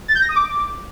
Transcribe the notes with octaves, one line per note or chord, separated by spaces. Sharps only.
A6
G6
A#6
D#6
D6